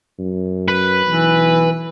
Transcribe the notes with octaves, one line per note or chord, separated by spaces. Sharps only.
F#2
B4
B1 E3